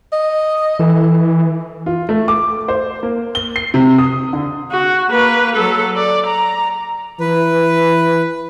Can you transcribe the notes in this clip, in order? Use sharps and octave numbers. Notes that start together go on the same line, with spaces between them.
D#5
E3 A4
F4
A3
D6
C5
A#3
G7
C7
C3
D#6
D3
F#4
A#3 B4
F#3 A4
D5
A#5
E3 B4